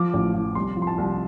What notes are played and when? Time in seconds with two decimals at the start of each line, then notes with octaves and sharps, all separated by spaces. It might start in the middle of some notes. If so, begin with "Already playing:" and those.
Already playing: F3 D6
0.13 A1
0.34 F3
0.55 C2 C6
0.77 F3
0.82 C6
0.87 A5
0.98 C2